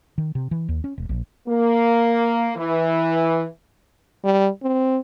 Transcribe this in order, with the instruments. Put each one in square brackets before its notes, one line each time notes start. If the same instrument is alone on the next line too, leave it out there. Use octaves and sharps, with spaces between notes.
[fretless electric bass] D#3
C3
E3
D#2
C#4
E1
A#1
[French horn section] A#3
E3
[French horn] G3
C4